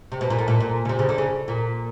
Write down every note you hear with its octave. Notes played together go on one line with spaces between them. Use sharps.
C3
B2
A#2
A2
A#2
A#2
C#3
C3
C#3
D3
C#3
A#2